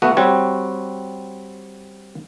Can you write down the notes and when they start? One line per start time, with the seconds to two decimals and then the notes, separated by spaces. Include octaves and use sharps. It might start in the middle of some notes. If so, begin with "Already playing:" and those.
0.02 A3 B3 F#4
0.17 G3 C4 F#4 C#5